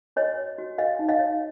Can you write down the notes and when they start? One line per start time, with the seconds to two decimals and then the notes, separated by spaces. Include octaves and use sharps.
0.16 F#4 C#5 D#5
0.38 C#5
0.58 F#4
0.78 F#4 D#5 F5
0.99 D#4
1.08 D#5 F5
1.19 C#5